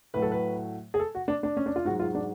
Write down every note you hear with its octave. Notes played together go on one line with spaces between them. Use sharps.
A2 F#3 B4
A4
B4
G#4
A4
F#4
D4
D4
C#4
D4
F4
G#2 F#3 F#4
F4
D4